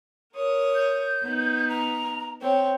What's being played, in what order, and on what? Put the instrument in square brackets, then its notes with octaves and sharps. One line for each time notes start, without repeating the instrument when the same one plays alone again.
[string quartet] A#4 C#5 D#6
[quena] G6
[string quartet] B3 D#4
[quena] A#5
[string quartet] C4 C#5 G5 [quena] C5